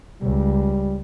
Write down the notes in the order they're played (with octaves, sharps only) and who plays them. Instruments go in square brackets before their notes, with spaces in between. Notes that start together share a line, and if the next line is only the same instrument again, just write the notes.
[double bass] C#2 [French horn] G3